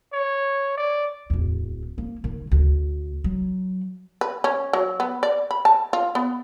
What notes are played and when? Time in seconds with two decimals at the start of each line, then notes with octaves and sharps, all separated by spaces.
0.13 C#5
0.77 D5
1.30 D1 E2
1.98 A#3
2.24 D#3
2.51 D2
3.24 F#3
4.21 B4
4.44 C#4
4.73 F#3
5.00 B3
5.23 D5
5.51 B5
5.65 A5
5.93 F4
6.15 B3